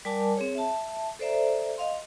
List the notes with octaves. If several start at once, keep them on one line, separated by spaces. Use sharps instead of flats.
G3 A#4 D5 G#5 A5 D6
C4 G#4 C#5
E5 A5
A4 C5 D5 E5 A#5
D#5 F5 C6